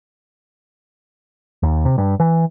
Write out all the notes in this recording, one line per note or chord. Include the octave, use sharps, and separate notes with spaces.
D#2
C3
G2
E3